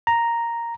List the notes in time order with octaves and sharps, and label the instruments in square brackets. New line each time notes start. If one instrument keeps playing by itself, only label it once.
[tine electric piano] A#5